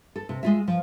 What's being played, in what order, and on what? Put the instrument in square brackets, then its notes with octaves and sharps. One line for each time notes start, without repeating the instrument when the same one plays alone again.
[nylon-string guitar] A4
C3
G#3 F4 E5
F3